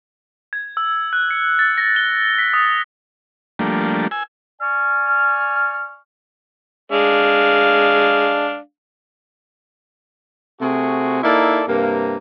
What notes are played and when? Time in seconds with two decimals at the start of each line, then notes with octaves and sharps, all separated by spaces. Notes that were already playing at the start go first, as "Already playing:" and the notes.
0.53 G#6
0.77 E6
1.13 F#6
1.31 C#7
1.59 A6
1.78 A#6
1.96 G7
2.38 B6
2.54 D#6
3.59 F3 G3 A3 A#3 D4
4.11 G#5 E6
4.60 D5 G#5 C#6 F6
6.92 G#3 D4 F5
10.60 C3 A3 C4 F#4 G#4
11.22 A#3 D#4 E4 A4 D5
11.67 G2 C3 A#3